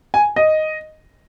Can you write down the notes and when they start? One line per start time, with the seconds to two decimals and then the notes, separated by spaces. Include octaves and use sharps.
0.14 G#5
0.36 D#5